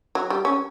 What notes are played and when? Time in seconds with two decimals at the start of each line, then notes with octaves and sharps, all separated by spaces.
0.15 F#3
0.30 G3
0.45 C#4